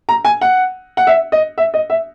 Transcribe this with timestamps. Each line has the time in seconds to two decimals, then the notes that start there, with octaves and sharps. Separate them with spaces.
0.09 A#5
0.25 G#5
0.41 F#5
0.97 F#5
1.07 E5
1.32 D#5
1.58 E5
1.74 D#5
1.90 E5